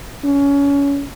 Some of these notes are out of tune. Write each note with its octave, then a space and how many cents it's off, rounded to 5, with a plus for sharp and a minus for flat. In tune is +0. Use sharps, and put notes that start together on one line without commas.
C#4 +25